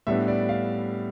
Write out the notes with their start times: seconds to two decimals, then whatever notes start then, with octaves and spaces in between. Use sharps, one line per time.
0.07 A2 G3 B3 D4 E5
0.28 D5
0.49 F5